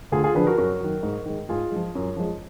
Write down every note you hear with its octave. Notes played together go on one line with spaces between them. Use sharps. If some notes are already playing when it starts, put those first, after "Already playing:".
D2 F4 G#4
F4 G#4
D3 F3 G#4 B4
F#4 A#4
F#2 F#4 A#4
D#3 F#3
G#2
D#3 G#3
G#2 F4 G#4
F3 G#3
F#2
F3 G#3